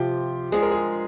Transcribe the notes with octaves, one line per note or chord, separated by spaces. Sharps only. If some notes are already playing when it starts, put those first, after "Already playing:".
Already playing: F2 C3 F3 F4 G4
G2 F3 G#3 G#4
A#4
G#4